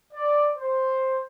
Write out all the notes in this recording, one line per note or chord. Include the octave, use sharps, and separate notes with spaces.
D5
C5